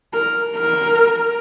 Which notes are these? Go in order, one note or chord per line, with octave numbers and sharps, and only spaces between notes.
A#4
A#4